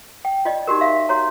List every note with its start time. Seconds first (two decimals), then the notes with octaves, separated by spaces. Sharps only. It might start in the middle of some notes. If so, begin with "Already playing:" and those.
0.25 G5
0.45 F4 D5 D#5
0.67 D#4 F#4 G4 A#4
0.81 E5 F5
1.09 F#4 C#5 A#5